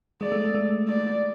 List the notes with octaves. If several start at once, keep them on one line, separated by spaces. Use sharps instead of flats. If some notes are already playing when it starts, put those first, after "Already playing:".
G#3 D5
A3
A3
D5